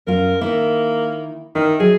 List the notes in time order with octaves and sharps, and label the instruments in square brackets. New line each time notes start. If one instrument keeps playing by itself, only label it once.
[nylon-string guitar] F#2 F4 [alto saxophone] A#4
[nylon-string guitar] D#3 E4 [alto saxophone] A#3
[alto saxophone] D#3 [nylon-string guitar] E4
[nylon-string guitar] F#3 [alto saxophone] G#4